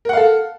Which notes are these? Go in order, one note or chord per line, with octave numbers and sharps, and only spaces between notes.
A4 A#4 F5 F#5